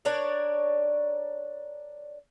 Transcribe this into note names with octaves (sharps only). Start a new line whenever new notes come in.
D4 A#4 C#5 D5